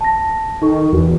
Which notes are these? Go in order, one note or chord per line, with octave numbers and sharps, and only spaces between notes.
A5 A#6
D#3 D#4 A4 C#6
E2 F#4